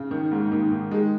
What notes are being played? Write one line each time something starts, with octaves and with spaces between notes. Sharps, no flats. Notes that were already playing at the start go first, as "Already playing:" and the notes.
Already playing: C#3
D#3
G#2
D#3 A#3
D#3
D#3 G#3